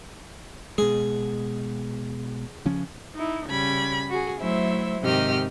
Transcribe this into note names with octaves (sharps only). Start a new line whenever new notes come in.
B2 G#3 G#4
C#3 F3 C#4
D#4 E4
C#3 G3 B5 G#6
F#4 G#4
F#3 A3 E4 C5 E5
G#2 C3 D#3 G4 D#5 F6